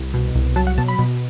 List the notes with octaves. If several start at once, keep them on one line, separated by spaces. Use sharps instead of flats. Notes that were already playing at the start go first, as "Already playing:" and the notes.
Already playing: C2
B2
C2
F#3 A5
F#5
B2 A5
B5
B2